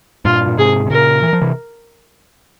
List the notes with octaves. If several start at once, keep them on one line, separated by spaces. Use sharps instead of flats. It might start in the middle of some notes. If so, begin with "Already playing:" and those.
G2 A#2 F4
A#2
G#2 C3 G#4
C3
A#2 C#3 A#4
E3
F3
C3 E3